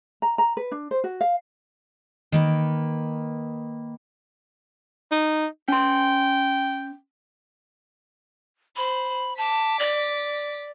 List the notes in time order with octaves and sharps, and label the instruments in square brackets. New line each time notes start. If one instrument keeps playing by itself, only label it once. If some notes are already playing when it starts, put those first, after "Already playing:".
[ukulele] A#5
A#5
B4
D4
C5
F#4
F5
[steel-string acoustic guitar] D#3 A#3 B4
[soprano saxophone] D#4
[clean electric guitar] C#4 C6 [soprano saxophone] G5
[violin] C5 [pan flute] B5
[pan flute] A5 [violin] D6 B6
[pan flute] D5